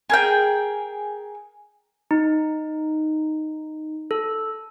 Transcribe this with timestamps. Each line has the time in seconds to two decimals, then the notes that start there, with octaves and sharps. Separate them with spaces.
0.10 G#4 A#4 G5
2.11 D#4
4.11 A4